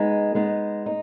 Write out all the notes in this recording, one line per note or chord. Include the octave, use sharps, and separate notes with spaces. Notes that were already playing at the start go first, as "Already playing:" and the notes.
Already playing: G#3 B3 D#4
G#3 B3 D#4
D#4